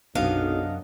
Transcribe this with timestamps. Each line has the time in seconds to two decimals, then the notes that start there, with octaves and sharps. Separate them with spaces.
0.15 B1 F#2 C3 B3 D4 D#5 F5